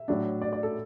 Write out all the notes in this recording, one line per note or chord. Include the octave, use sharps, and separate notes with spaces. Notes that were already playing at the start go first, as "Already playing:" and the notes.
Already playing: E5
A2 F#3 D4
D5
D5
A4